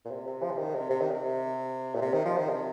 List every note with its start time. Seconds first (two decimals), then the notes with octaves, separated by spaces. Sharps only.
0.05 A#2
0.11 C3
0.27 C3
0.43 F3
0.50 C3
0.58 D#3
0.75 C3
0.90 C3
1.01 D#3
1.11 C3
1.95 A#2
2.02 C3
2.13 D#3
2.25 F3
2.37 D#3
2.49 C3